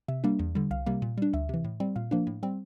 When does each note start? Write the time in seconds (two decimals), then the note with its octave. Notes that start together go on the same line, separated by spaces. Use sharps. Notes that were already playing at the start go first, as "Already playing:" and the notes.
0.08 C3 E5
0.24 G3 A#3 D4
0.39 E2
0.55 D3 G3
0.71 C2 F5
0.86 C3 G3 A#3
1.02 A#2
1.18 G3 D4
1.33 D2 E5
1.49 C3 E3
1.64 A2
1.80 G3 C4
1.96 A#2 F5
2.11 F3 A#3 D4
2.27 A2
2.43 G3 C4